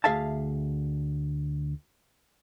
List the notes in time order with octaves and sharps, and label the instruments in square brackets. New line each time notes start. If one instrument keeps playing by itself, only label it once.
[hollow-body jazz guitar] D2 G#4 E5 F5 A5